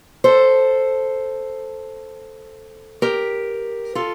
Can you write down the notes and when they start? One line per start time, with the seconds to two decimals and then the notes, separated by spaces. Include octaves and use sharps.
0.24 A4 C5
3.02 G4 A#4
3.95 F4 A4